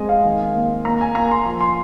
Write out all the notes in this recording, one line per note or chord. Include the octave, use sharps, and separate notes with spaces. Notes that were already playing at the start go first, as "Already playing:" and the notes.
Already playing: G#3 C4 D#5 G#5
F5
D#3
A#3
A#3 A#5
G#5
A#3 A#5
C6
F3 C6
C6